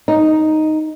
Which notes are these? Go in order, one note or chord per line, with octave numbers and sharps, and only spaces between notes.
D#4